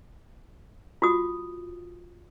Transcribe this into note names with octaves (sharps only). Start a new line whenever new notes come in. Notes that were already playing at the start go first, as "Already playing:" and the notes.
F4 F#4 D#6